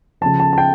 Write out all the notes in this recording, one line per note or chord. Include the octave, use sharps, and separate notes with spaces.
C#3 F3 A5
A5
A5
G5